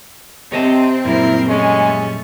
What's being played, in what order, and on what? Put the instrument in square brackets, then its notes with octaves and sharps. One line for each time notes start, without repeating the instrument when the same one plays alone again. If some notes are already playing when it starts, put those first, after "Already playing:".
[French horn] C3 [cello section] C4 [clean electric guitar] C#5 D#5 A5
[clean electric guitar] F#2 A#2 G3 [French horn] E4 [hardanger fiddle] A#4
[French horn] G#3 [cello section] A3 [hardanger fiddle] C#4